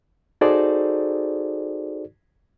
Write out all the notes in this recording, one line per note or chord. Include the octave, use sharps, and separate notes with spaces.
D#4 F#4 G#4 A4 C5 D5